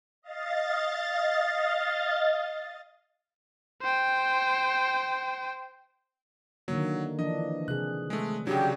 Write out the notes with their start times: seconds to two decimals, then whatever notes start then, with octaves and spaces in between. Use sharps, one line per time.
0.22 D#5 F5 A6
3.82 C5 G5
6.68 D3 D#3 F#3 A#3
7.19 E3 F3 D4 D#5
7.68 C3 G#4 F#6
8.10 G#3 A3
8.47 C#3 F#3 D4 F#4 G4